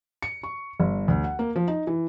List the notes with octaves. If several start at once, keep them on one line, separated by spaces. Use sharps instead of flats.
C#7
C#6
G1
D2
F#5
A#3
F3
D#4
E3